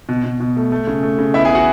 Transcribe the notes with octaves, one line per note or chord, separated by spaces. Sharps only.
B2
B2
B2
A3
A3
C#3
A3
C#3
B3 E4 E5
G#4 G#5
B3
F#4 F#5